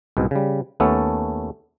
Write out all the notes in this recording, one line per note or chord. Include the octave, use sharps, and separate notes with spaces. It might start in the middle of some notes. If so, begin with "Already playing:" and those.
C2 G#2 B2
C#3 G3
D#2 A3 B3 C#4 A4 A5